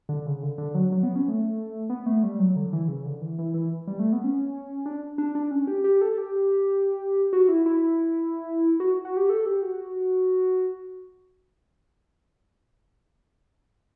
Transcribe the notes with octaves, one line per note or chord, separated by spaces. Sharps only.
D3
C#3
D3
D3
F#3
F#3
B3
C#4
A3
B3
A3
G3
F#3
D3
E3
C#3
D3
E3
E3
E3
G3
A3
B3
C#4
D4
D4
D4
C#4
G4
G4
A4
G4
F#4
E4
E4
F#4
F#4
G4
A4
G4
F#4